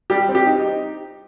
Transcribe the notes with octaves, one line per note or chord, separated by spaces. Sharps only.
G3 G4
C4
G4
D#4